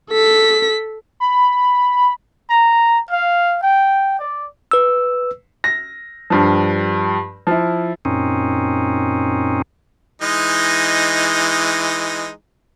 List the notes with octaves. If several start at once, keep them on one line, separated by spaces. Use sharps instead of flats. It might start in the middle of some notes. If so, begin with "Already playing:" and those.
A4 B6
B5
A#5
F5
G5
D5
B4 E6
A#6
G2 F3
F3 E4
F#2 A#2 C4 C#4 D#4
E3 G#3 D#4